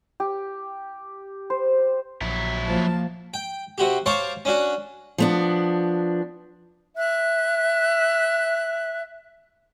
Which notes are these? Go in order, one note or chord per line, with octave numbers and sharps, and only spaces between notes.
G4
C5
A#1 A#2 F#3 E4
F3 A#3 A5
G5
C3 F#4 G4
C5 C#5 F5 A5 C#6 D6
C#4 D4 F#4
F3 B3 D4
E5 F#6